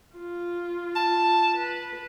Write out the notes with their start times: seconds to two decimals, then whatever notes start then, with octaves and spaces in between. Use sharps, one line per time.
0.16 F4
0.96 A5
1.55 B4